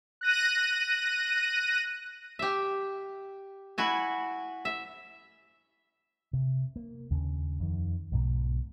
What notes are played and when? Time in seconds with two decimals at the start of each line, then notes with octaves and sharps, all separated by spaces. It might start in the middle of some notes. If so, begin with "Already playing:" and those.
0.21 F#6 A#6 D#7
2.39 G4 E5
3.78 E4 F#4 G#5
4.65 E5
6.33 C3
6.76 A#3
7.11 D#2 C#3
7.60 F2 D#3
8.12 B1 G#2 B2